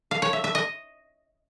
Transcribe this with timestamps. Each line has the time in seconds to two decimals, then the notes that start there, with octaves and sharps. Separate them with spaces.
0.11 F5
0.22 C#5
0.33 E5
0.44 E5
0.55 D#5